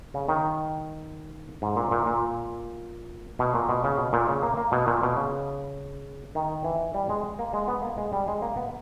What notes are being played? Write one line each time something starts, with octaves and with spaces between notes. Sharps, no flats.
C#3
D#3
G#2
A#2
A#2
A#2
B2
A#2
B2
C#3
B2
A#2
C#3
A#3
A#3
B2
A#2
B2
C#3
D#3
E3
G3
G#3
A#3
G#3
B3
A#3
G#3
G3
G#3
A#3
B3